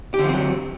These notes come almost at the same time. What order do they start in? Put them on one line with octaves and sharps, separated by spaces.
G4 D3 F3 C4 F#3